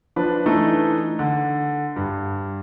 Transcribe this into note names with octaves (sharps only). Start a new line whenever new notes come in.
F3 D4 B4
E3 A3 D4 D#4
D3
G2